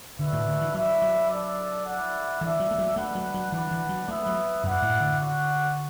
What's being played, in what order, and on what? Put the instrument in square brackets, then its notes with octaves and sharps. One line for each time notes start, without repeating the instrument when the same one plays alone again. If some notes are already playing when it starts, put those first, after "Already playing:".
[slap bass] D3 [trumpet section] D4 F#4 B4 E5
[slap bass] A2
D3
E3
[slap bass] F#3 [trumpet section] D4 B4 E5
[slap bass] F#3
[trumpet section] D4 A4 D5
E4 A4 D5 F#5
[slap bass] E3 [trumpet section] D4 A4 E5
[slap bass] F#3
A3
F#3
[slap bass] A3 [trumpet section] D4 B4 F#5
[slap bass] F#3
F#3
[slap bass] E3 [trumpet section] D4 B4 D5 F#5
[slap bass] E3
F#3
[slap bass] A3 [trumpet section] B3 E4 B4 E5
[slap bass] F#3
[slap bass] F#2 [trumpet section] E4 D5 F#5
[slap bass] A2
D3
[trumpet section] F#4 D5 F#5